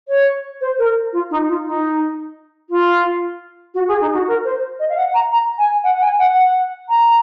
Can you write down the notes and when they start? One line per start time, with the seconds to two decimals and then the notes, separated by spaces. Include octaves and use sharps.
0.08 C#5
0.61 C5
0.79 A#4
1.13 F4
1.31 D#4
1.48 F4
1.65 D#4
2.70 F4
3.74 F#4
3.88 G#4
4.01 D#4
4.14 F#4
4.28 A#4
4.45 C5
4.80 D#5
4.89 F5
4.97 F#5
5.14 A#5
5.32 A#5
5.58 G#5
5.84 F#5
6.02 G#5
6.19 F#5
6.36 F#5
6.89 A#5